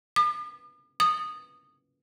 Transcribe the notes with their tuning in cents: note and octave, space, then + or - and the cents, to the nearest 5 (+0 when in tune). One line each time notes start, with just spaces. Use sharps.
D#6 -45
D#6 -15